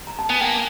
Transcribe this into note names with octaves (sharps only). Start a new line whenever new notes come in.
A#5
A5
B3 G#5
A#3 G5